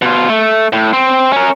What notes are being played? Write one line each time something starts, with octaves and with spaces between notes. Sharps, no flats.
B2 F4
A3
A2
C4
C#4 A#4